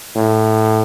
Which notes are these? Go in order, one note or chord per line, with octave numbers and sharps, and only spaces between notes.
A2